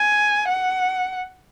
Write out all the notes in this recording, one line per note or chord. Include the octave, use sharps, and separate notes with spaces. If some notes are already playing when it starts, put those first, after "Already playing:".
Already playing: G#5
F#5